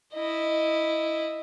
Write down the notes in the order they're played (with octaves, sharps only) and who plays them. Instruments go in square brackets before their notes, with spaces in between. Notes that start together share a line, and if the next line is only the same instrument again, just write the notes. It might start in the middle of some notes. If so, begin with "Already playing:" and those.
[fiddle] E4 D#5